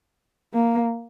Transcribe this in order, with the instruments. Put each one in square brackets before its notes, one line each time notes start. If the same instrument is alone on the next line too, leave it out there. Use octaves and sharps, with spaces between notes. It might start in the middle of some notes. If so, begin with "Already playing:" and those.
[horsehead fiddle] A#3